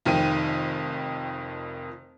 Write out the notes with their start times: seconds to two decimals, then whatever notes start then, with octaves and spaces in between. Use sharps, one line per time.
0.05 F1 F2 D#3 G5 D#7